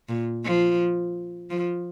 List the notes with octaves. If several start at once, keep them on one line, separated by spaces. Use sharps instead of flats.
A#2
F3
F3